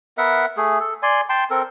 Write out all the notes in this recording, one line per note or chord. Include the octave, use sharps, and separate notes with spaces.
B3 A#4 E5 F#5
A3 G#4
A4
D5 G#5 C6
G5 A5 C6
C4 A4 A#4